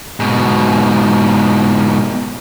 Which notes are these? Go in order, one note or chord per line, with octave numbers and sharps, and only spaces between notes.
G#2 B2